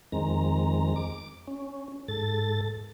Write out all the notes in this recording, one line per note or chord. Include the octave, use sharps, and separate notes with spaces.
F2 D#3 G#3 C4 A#5
D6
C#4
G#2 A4 A6